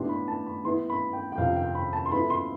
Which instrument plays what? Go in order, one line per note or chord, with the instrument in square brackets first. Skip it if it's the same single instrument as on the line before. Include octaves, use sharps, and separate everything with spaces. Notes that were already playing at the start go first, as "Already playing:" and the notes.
Already playing: [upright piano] A2 E3 B3 D4 G4 [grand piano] C6
[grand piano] B5
A5
B5
[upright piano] E3 B3 E4 [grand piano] C6
[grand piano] B5
G5
G5
[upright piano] F2 C3 F3 [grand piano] F5
[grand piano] G5
B5
A5
C6
[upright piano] F3 B3 E4 A4 E5 [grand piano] B5
[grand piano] C6